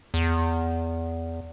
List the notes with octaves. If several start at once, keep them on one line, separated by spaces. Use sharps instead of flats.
E2